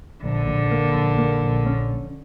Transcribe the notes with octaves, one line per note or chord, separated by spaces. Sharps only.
A#1 D3
A#1
A#3
A#1
A#3
A#1
C#4